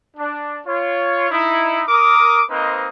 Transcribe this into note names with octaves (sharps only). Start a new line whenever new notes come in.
D4
F4 C#5
D#4 E4
A#4 D6 D#6
A#3 C4 D#4 B4 C5 D#5